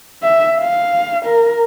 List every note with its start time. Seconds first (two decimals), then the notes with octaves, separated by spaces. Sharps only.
0.22 E5
0.59 F5
1.25 A#4